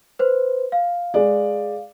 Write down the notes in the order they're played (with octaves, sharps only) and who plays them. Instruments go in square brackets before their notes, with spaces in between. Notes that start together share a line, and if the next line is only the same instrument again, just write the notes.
[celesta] B4 C5
F5
[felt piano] G#3 D5